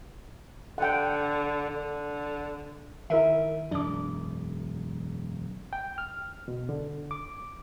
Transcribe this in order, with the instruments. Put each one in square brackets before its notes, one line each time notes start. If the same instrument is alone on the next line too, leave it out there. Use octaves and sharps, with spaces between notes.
[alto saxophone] D3 [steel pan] F#5 G5
[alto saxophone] D3
[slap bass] D#3 [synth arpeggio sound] E4 A#4 E5
[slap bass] E1 F#2 [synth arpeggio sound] D4 D6
[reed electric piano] G5
F6
B2
D3
D6